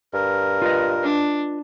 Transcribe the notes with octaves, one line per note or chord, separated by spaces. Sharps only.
G2 A#4
F4 B4 D#5
D4